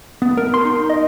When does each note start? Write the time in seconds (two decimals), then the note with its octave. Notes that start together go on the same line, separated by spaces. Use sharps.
0.22 B3
0.37 A#4
0.54 C6
0.65 D#4
0.90 D#5